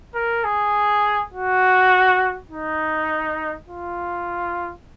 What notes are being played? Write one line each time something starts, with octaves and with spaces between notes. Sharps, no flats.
A#4
G#4
F#4
D#4
F4